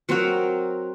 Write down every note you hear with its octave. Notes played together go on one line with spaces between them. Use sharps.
F#3 C4 F#4 A#4